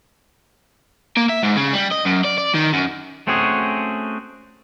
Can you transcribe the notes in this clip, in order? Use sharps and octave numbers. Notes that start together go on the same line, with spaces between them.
A#3
E5
G#2
C#3
G3
D#5
F#2
D5
D5
D#3
F#2
A3 C4 C#4 F#4 G#4